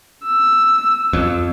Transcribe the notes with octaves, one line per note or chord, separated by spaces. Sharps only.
E6
F2